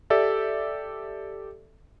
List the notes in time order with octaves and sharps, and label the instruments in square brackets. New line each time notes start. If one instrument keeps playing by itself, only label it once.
[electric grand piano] G4 A4 D5 E5